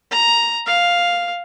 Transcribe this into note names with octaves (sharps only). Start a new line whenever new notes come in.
A#5
F5